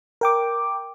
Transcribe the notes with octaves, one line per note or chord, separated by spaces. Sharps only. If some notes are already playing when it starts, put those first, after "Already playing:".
A#4 G5 D6